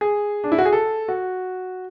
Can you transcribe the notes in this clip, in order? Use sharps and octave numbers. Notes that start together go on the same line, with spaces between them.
G#4
D4
E4
F#4
G#4
A4
F#4